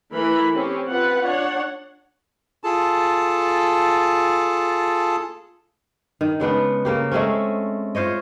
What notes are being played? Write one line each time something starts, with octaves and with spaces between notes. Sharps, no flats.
E3 A3 A#4 B5
C4 C#4 G4
C4 F4 B4 F#5
D4 C#5 F#5
F4 G#4 A4 A5
D#3
C#3 G#3 B3 D4
C#3 A#3 G4
G#3 A3 C4 C#4
F4 C5 C#5 D#5